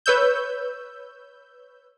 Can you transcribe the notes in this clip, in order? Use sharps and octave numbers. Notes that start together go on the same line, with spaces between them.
B4 C#5 E6 G6